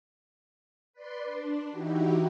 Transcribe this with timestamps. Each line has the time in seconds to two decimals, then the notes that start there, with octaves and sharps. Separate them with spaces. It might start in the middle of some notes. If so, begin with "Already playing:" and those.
0.93 B4 D5 C6
1.24 D4
1.71 E3 D#4 E4 F#4 G4